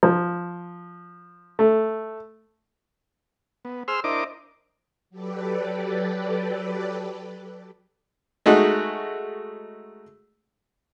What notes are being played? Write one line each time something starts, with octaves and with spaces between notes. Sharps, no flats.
F3
A3
B3
G#4 C5 C6 E6 F6
D4 E4 A#4 C5 D#5 D6
F#3 G4 A4 B4 D5
G#3 A3 D#4 F#4